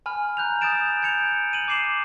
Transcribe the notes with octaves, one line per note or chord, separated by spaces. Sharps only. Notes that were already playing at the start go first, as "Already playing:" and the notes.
G#5 B5 F6
A#5 F#6 G6 F7
D#6 F#6 G6 A6 D7 E7
G6 G#6 C#7 D7 F7
D#7 F#7
D6 G6 C7 E7 F#7